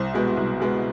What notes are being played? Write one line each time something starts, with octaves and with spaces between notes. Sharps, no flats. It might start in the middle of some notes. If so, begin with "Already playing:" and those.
Already playing: C2 C5
B2 G#3 B3
C2
B2 G#3 B3